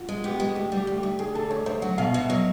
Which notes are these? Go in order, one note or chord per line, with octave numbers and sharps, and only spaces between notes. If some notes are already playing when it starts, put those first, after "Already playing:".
Already playing: F4 F#4
G#3
B3 G4
G#3 F#4
D2 G4
G3
G4
D2
G4
D2
D2 G#4
D3 A4
D2 C#5
D2 C5
F#3 F#5
B2 F5
B2 E5
F#3 D#5